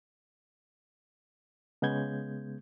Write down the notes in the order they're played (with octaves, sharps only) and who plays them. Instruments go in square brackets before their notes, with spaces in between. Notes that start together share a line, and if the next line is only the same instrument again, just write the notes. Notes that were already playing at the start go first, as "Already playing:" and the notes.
[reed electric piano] C#3 G#3 B3 G6 G#6